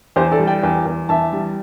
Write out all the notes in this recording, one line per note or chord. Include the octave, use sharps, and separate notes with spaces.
E2 G4 C5
A4 D5
G3
D5 G5
E2
E2
E2 E5 A5
G3